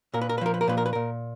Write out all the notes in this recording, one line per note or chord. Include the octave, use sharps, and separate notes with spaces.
A#2 A#4
B4
A#4
B4
F3 A#4
B4
A#4
A#2 B4
A#4
B4
A#2 A#4